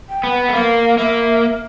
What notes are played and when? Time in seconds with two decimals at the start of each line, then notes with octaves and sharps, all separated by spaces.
0.09 G5
0.24 B3
0.31 F#5
0.49 A3
0.53 A#3 F5
0.98 A#3 E5